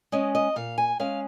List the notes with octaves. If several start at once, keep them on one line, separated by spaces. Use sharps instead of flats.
G#3 C#4 D#5
D#5
A#2 F5
G#5
G#3 C#4 F5